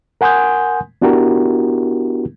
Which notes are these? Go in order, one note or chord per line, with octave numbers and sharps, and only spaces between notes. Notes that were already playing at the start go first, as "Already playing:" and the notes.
A#4 F#5 G#5 C6 D#6 G6
B3 D4 E4 F#4 G4 A#4